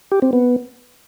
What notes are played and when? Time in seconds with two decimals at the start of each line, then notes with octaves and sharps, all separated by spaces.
0.12 G4
0.22 C4
0.33 B3